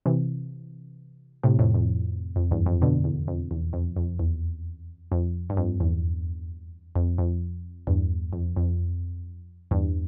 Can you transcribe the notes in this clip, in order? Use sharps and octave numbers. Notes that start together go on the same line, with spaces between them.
C3 E3
A2 C3
F2 A2
F2
F2
E2 G2
F2
B2 D3
E2
F2
E2
F2
F2
E2
F2
G2
F2
E2
F2
F2
E2 G2
F2
F2
E2 G2